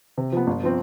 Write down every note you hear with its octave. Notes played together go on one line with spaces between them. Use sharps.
C3
F3 B3
G1
F3 C4